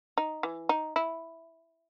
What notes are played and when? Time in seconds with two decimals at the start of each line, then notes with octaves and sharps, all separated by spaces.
0.18 D#4
0.43 E3
0.69 D#4
0.96 E4